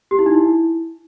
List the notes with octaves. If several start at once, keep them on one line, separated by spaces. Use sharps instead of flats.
G4
E4
D#4
E4